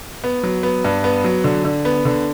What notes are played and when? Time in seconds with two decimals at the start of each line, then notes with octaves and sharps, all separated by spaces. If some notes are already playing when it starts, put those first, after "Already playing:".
0.24 B3
0.43 F#3
0.63 B3
0.85 G2
1.04 B3
1.24 F#3
1.44 D3
1.65 D3
1.85 B3
2.05 D3